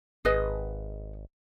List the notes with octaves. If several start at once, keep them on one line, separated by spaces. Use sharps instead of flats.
G#1 G#4 B4 D#5